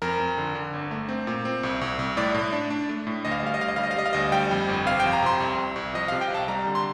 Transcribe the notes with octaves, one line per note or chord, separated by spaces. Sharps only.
F2 A#4
F2
D3
D3
G1
A3
C4
A#2
C4
C2
C2
C2
A2 D5
A2
D4
D4
A3
A2
D2 D#5
F5
D#5
G3 F5
D#5
D2 F5
D#5
G3 F5
D#5
F5
G3 D#5
F5
D2 D#5
G3 G5
F2
G1
C3 F5
F2 G5
A#5
C3 C6
C2
C2
C2
F3 D#5
C3 F5
G5
C2 A5
G3 A#5
D3
C6